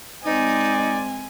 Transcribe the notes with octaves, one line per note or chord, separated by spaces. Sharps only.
G#3 C4 D#4 D5 G#5